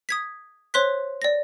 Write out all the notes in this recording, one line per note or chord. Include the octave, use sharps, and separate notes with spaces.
D#6 G#6 B6
C5 C#5 C6 F#6 B6
D5 A#6